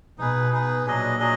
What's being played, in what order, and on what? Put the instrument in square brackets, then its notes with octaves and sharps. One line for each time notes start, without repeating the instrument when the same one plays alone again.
[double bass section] B2 [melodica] D#4 G#4 B4
[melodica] D#4 G#4 B4
[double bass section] A#2 [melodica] F#3 D4 G#4 D#5
[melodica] F#3 D4 G#4 D#5